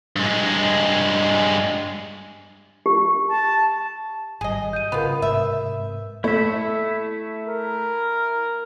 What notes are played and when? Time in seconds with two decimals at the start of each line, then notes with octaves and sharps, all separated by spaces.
0.16 G2 G#3
2.86 G4
3.29 A5
4.41 G#1 G3 G#4 D#5
4.73 G6 D#7
4.92 C#3 B3 F4 A#4 B4 B5
5.22 G#2 C3 E5
6.24 A3 E4 E5
7.48 A#4